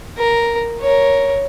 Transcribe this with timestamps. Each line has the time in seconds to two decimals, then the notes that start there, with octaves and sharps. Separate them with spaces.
0.18 A#4
0.81 A#4 C#5